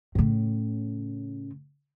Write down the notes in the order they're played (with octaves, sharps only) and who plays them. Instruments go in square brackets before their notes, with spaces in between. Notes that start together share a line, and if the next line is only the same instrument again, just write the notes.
[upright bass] A2 C#3